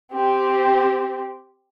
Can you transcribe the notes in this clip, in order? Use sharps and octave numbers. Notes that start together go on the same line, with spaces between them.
C4 G4